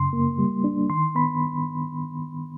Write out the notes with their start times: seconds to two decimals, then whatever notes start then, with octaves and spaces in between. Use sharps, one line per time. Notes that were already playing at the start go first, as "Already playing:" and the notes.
Already playing: F#2 C#3 C6
0.13 A#3
0.38 G3
0.64 D4
0.90 D#3 C6
1.15 B3 B5